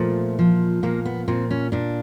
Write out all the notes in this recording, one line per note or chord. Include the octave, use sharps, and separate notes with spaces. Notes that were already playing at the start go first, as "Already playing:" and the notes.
Already playing: A#2 F3 A3
F3
A#2 A#3
B3
A#2 C4
C#4
A#2 D4